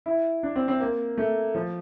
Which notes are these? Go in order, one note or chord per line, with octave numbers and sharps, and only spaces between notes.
E4
D4
C4
C4
A#3
A3
F3